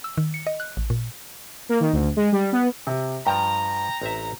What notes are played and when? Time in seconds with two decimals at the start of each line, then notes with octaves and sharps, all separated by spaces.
0.04 E6
0.18 D#3
0.34 C#7
0.47 D#5
0.60 F#6
0.77 A1
0.90 A#2
1.69 A#3
1.80 D#3
1.93 D2
2.17 G#3
2.32 G3
2.52 B3
2.87 C3
3.27 G2 F3 G5 A#5
4.02 A1 C4 E5